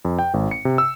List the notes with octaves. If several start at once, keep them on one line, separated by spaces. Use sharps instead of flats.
F2
G5
G#1
C#7
C3
E6